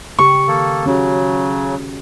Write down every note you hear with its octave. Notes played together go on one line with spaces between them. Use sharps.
C#3 G4 C#6
D#3 A#3 A4
C#3 F#3 C#4 F#4 G#4